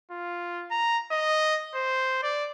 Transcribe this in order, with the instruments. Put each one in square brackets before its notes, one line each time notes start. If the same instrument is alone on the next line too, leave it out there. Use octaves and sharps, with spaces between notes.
[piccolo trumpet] F4
A#5
D#5
C5
D5